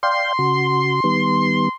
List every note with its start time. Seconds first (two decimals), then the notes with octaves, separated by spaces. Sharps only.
0.03 D5 F5 G5 C6
0.39 C#3 F#4
1.04 D#3 G3 B3